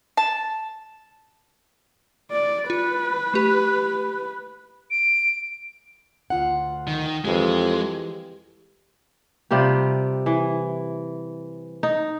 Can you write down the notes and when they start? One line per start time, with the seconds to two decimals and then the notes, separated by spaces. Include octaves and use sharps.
0.17 A5
2.31 D5
2.70 F4 B4
3.34 A3 G4
4.91 D7
6.30 D2 F4 F#5
6.87 D#3
7.25 F2 E3 G#3 G4
9.51 C3 G3 F4 G4
10.26 E3
11.83 D#4